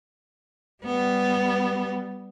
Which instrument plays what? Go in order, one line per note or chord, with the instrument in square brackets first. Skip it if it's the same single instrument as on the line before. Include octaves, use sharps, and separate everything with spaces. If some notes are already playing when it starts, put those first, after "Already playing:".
[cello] G3 B3